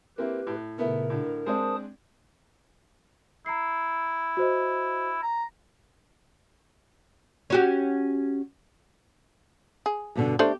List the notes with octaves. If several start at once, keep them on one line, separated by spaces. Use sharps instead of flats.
A#3 C4 E4 G4 B4
A2
A#2 C#3 A3 B3 E4 A#4
A2 D3
G#3 C4 D4 C5 A5 D#6
E4 A#5 C7
F#4 C5 D#5
A#5
C#4 F#4 G4
G#4
G2 B2 D3
A3 D4 G4 C5